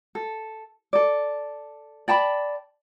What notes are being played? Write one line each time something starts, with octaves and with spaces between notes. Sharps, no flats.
A4
A4 D5
D5 G5 A5 B5